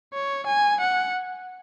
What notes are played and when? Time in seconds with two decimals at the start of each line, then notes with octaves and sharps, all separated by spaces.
0.13 C#5
0.47 G#5
0.81 F#5